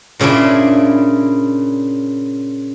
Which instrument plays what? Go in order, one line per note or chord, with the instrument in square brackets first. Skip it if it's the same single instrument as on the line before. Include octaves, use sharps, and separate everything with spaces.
[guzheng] A#2 C#3 C#4 D4 E4